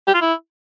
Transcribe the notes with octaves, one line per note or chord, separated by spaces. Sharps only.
G4
F4
E4